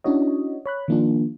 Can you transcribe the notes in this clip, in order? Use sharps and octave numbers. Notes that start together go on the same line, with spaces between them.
C#4 D4 E4 F#4 C#5 D#5
C#5 B5 F#6
D#3 F3 A#3 D4 F4